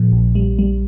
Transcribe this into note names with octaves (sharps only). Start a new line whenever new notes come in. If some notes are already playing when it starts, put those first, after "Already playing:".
Already playing: A#2 F3
A#1
G3
G3